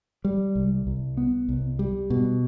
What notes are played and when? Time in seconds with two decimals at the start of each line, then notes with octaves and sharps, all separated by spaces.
0.25 G3
0.55 C2
0.87 C2
1.17 B3
1.49 C2
1.79 G3
2.10 B2